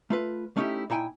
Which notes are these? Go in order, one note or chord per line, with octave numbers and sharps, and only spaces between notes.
A3 F4 B4
A3 C#4 D#4 E4 G4
A#2 D#4 E4 G5 G#5